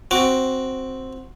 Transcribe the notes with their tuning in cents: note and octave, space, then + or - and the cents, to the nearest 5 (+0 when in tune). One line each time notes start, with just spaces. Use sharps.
C4 +0 F#4 +0 D6 +0